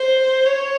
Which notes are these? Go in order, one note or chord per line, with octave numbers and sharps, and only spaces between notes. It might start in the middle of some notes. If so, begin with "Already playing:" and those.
Already playing: C5
C#5